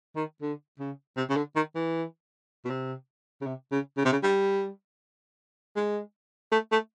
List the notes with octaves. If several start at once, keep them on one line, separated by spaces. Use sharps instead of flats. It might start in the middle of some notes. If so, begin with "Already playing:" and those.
D#3
D3
C#3
C3
C#3
D3
D#3
E3
B2
C3
C#3
C3
C#3
C#3
C3
C#3
G3
G#3
A3
A3